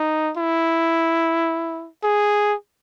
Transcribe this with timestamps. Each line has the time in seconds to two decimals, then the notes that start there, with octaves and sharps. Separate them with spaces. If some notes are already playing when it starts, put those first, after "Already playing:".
Already playing: D#4
0.37 E4
2.04 G#4